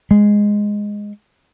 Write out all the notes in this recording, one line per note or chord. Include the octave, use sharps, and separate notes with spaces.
G#3